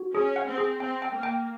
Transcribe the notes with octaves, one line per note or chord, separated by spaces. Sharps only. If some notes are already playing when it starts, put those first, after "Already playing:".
Already playing: F#4
C#4 G#4
F#5
C4
G#4
C4 G5
G5
A#3
G5